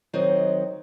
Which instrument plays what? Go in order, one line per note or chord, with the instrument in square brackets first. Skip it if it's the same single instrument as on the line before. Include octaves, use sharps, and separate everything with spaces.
[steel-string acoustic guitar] D#3 F#3 C4 D#5